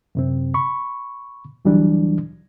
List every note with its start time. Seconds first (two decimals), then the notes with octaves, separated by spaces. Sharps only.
0.15 F#2 C3 C4
0.54 B5 C#6
1.65 D2 E3 F#3 G3 D4